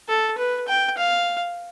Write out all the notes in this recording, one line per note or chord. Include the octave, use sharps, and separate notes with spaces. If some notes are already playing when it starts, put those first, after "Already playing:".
A4
B4
G5
F5